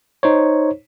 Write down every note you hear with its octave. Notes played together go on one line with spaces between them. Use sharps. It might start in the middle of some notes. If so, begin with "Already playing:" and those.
D#4 C5 C#5